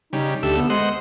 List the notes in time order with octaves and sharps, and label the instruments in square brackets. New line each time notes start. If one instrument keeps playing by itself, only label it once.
[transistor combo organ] C#3 G3 [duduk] D#4
[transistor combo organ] D2 A3 E5 [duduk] G4
[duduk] B3
[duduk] G#3 [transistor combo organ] C5 D#5 F#5